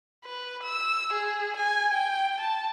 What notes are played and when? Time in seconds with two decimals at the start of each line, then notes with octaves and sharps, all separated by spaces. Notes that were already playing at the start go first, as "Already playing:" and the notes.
0.25 B4
0.63 E6
1.13 G#4
1.56 G#5
1.94 G5
2.40 A5